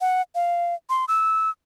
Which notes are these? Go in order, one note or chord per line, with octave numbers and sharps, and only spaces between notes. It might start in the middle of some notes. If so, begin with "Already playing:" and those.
F#5
F5
C6
E6